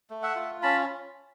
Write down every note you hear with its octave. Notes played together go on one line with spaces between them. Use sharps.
A3
E5 F#5
F4
C#4 A5 B5